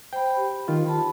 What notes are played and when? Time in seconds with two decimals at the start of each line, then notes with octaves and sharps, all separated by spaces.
0.13 C5 G5 B5
0.37 G4
0.68 D#3 F4
0.86 A5 B5